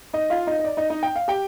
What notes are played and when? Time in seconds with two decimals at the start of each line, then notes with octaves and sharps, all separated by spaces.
0.13 D#4 D#5
0.30 F4 F5
0.47 D#4 D#5
0.59 D#5
0.65 D5
0.77 D#4 D#5
0.90 D#4 D#5
1.03 G5
1.16 F5
1.28 G4 G5